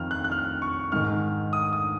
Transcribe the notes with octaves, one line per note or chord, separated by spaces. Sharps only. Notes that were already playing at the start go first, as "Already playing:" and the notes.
Already playing: F2 D#3 F6
F#6
F#6
F6
C#6
G#2 D#3 F6
D#6
D#6